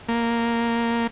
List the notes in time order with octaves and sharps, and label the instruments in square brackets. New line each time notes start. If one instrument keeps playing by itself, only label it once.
[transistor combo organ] A#3